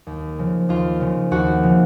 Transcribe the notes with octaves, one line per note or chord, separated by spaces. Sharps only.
D#2
C#3 F3
D#2 F4
C#3 F3
D#2 F#4
C#3 F3